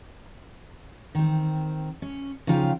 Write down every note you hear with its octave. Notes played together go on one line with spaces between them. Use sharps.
D#3 C4
C#4
C#3 F3 D#4 F4 G5